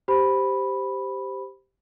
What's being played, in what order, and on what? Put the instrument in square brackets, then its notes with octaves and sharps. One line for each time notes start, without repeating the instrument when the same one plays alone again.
[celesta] G4 C5 B5